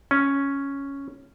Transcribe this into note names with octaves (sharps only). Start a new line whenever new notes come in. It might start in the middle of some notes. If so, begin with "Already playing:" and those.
C#4